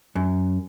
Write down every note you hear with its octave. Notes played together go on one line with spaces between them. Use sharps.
F#2